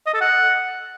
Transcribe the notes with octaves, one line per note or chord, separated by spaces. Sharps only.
D#5
A4
F#5